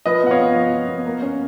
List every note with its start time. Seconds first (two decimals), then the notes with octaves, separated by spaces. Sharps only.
0.06 F3 B4 D#5
0.23 B3 F#5
0.31 C#5 F5
0.40 B3
0.55 F3
0.73 F3
0.89 B3
1.06 A#3
1.22 C#4